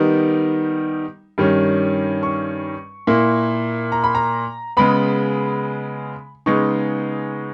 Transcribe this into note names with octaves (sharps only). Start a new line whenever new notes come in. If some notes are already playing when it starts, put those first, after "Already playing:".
Already playing: D#3 G3 B3 D#4
G2 D#3 G3 C#4
C#6
A#2 A#3 E4
A#5
B5
A#5
C#3 G#3 B3 B5
C#3 G#3 B3 D#4 C#6